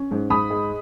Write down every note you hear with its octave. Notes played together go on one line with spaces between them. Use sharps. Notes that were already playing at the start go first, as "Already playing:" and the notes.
Already playing: C#4
G#2
G#2 B5 D#6
G#3